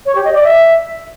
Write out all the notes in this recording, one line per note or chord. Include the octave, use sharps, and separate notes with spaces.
C#5
G4
D#5
D5
E5